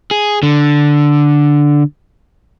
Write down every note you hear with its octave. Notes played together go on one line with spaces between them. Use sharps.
G#4
D3